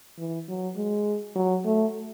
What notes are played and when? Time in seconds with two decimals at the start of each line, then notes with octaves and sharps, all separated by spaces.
0.18 E3
0.48 F#3
0.76 G#3
1.36 F#3
1.65 A3